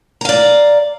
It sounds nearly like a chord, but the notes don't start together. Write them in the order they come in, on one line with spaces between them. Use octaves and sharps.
A#5 F5 D5